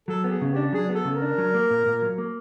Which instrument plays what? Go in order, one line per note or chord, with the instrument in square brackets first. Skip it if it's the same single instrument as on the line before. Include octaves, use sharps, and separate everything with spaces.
[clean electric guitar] F#3 [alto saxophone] A4
[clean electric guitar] B3
[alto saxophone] G#4
[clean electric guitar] C#3
[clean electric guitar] D4 [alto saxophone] G4
[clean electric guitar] F#3 [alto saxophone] G#4
[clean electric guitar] B3
[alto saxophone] A4
[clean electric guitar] C#3
[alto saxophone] A#4
[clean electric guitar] D4
F#3
A#3
A#2
A#2
F#3
A#3